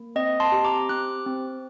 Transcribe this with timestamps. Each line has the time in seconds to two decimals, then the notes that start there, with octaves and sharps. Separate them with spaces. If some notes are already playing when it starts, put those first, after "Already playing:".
Already playing: A#3
0.16 C4 D#5
0.40 A5 C6
0.52 G4
0.65 A#5 D6
0.89 C4 D6 F#6
1.26 C4